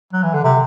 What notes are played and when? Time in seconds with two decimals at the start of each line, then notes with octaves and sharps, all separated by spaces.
0.13 F#3
0.23 E3
0.34 D3
0.44 C3